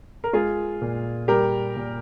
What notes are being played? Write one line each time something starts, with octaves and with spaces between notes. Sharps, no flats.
A#4
G#3 F4 G#4
A#2
G3 G4 A#4
A#2